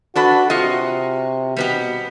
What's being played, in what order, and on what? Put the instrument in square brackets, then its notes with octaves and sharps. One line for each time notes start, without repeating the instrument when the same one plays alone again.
[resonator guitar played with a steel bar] D4 A4 B4 [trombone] F#4
[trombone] C3 [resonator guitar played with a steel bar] F4 F#4 D#5
[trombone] B2 [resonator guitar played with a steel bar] G3 B3 G4